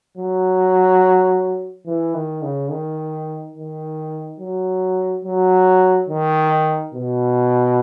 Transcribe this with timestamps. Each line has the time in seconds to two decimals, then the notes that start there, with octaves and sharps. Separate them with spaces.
0.17 F#3
1.86 E3
2.14 D#3
2.43 C#3
2.71 D#3
3.55 D#3
4.40 F#3
5.25 F#3
6.09 D#3
6.94 B2